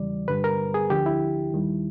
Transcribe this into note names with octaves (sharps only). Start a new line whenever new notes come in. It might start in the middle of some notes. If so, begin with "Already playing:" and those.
Already playing: E2 C#3 E3 G3 D5
G2 D3 G3 B4
A#4
G#4
D2 D3 F3 G4
E4
D#2 D#3 G3